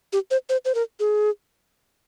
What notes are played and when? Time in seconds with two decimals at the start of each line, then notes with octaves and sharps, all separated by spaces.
0.13 G4
0.31 C5
0.49 C5
0.65 C5
0.75 A#4
1.00 G#4